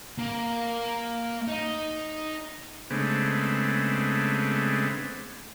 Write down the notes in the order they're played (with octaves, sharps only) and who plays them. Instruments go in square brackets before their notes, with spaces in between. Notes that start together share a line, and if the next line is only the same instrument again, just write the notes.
[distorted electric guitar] A#3
D#4
[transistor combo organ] C#3 G#3 A3 B3 C4 D4